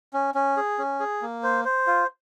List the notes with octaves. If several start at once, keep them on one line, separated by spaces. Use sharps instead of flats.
C#4
C#4
G#4
C#4
G#4
A#3
C5
C5
F4